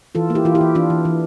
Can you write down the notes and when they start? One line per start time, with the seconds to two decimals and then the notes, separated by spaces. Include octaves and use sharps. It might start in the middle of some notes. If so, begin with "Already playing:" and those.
0.15 E3 F4 A4
0.30 A#3
0.35 E4 G4
0.45 E3 F4
0.55 E4 G4
0.61 E3
0.75 E3 D4 F4
0.90 E3
1.05 E3